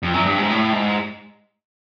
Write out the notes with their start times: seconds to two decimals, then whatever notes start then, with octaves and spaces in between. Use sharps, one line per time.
0.03 F2
0.14 F#2
0.26 G2
0.38 G#2
0.50 A2
0.73 G#2